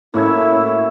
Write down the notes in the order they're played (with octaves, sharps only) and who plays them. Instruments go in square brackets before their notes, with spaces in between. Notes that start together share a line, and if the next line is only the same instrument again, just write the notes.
[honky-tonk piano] A2 C#4 G#6 [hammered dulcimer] A#3 F#4 E5 [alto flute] E4